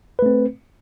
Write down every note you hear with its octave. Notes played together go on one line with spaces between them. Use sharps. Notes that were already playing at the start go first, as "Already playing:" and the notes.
A3 C4 B4